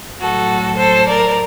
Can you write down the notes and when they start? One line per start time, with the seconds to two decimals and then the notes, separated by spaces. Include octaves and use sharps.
0.20 A2 F#3 F#4 A4
0.78 A4 C5
1.07 A#4 D5